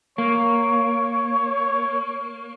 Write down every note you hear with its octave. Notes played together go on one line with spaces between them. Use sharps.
A#3 C#5